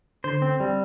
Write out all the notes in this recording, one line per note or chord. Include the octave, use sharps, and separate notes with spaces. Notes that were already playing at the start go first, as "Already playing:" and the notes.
D3 C5
C4
G3